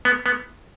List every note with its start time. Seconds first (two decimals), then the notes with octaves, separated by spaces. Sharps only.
0.05 B3
0.26 B3